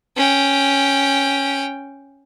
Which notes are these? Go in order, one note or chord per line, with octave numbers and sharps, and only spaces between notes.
C#4 G5